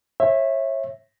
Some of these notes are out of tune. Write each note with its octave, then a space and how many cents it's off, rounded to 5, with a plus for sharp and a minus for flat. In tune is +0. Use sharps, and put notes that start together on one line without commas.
C#5 -30 E5 +0